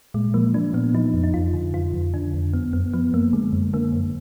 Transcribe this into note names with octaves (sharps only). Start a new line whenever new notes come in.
A#2 G#3
F3 A#3
F3 D4
A#2 B3
F3 D#4
F2
D#4
F2 F4
D3
F2 F4
F2
D3 D4
F2
F#2 B3
F#2 B3
F3 B3
F#2 A#3
D3 G#3
F#2
D3 A#3
F#2